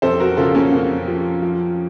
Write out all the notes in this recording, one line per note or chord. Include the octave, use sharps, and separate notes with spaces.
F2 A4 C5
F#4 A#4
C#3 F4 A4
A#3 C#4
F2
F3
F3